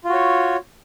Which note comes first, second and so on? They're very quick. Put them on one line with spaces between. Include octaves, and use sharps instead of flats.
F4 F#4 C#5